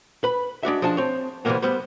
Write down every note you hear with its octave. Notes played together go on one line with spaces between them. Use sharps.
B4 B5
G#3 D4 F#4 E5
F3 G#3 D4 A5
C4 C#5
C3 E3 G3 G#3 A#3 B3
G3 B3 B4 C5